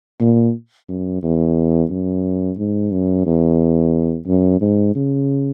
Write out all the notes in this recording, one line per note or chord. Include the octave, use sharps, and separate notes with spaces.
A#2
F#2
E2
F#2
G#2
F#2
E2
F#2
G#2
C#3